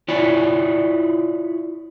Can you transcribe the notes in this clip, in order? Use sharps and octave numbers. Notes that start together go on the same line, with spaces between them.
E4 F4 C#5 D5